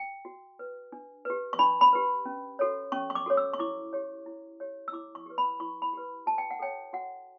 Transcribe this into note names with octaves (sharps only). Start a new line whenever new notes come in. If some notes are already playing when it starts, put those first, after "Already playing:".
Already playing: G5
F#4
B4
D4
G4 B4
C#6
D4 B5
B5
G4 B4
C#4
F#4 A4 C#5
C#4 C#6
C#6
D6
F#4 A4 C#5
E6
C#6
E4 D6
G4 C#5
E4
G4 C#5
E6
E4 D6
C#6
G4 B4
B5
E4 C#6
B5
G4 B4
F#4 A5
G5
F#5
A4 C#5 G5
F#4 F#5